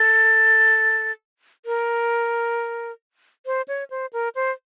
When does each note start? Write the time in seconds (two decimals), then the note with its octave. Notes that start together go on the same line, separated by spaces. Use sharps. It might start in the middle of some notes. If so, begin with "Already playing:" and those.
Already playing: A4
1.66 A#4
3.46 C5
3.68 C#5
3.90 C5
4.13 A#4
4.35 C5